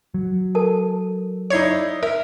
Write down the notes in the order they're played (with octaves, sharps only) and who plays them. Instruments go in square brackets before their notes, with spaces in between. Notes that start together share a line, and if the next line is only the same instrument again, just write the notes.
[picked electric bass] F#3
[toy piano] A4 A#4 A5
[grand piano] D#4 E4 D5 [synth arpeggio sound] C#5 G#6 C7
[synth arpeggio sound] A#4 [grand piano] E5